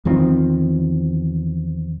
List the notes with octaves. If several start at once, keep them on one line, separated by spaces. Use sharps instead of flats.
E2 D#3 F3 C4